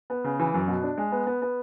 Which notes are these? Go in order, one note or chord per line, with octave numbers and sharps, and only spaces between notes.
B3
C#3
E3
F#2
B2
D4
G#3
B3
B3
B3